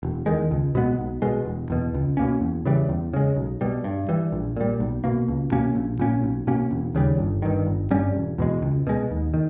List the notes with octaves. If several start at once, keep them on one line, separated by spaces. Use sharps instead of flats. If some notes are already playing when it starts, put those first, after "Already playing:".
E1
E2 D#3 G#3
C#2
B2 G#3 B3
B1
B2 G#3
E1
E2 B2
C#2
B2 A#3 C#4
E2
C#3 E3 G3
E2
C#3 G#3
B1
B2 G3
G2
E3 G3
A#1
A#2 G3
B1
B2 A#3
C#2
B2 A#3 C#4
A#1
A#2 A#3 C#4
B1
B2 A#3 C#4
E1
D#2 C#3 G3
G1
G2 D#3
G1
G2 G3 C#4
E1
E2 B2 G#3
C#2
B2 G#3
D#2
D#3